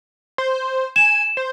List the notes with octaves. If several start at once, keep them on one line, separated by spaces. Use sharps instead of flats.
C5
G#5 E7
C5